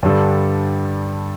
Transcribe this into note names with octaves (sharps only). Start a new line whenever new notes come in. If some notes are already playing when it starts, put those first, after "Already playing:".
G2 D3 G3 D4 A4